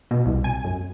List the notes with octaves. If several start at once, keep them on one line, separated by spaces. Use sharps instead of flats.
B2
C2
G#5
F#2